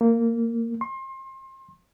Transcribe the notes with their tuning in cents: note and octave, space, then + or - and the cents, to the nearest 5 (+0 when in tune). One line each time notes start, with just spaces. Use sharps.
A#3 -15
C6 +30